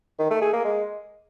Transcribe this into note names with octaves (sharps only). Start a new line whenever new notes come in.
D#3
A3
G#4
A#3
G#3